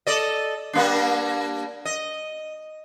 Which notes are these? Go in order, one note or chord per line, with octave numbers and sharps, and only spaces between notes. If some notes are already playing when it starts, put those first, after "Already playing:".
A4 D5 D#5
G3 A#3 D4
D#5